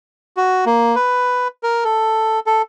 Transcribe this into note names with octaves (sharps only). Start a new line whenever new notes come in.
F#4
A#3
B4
A#4
A4
A4